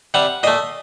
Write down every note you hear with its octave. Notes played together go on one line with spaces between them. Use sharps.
C3 G3 F#5
A#2 A3 D#5